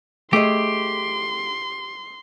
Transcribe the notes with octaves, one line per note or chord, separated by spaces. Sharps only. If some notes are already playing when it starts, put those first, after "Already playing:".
A3 G4 G#4 D#5 C6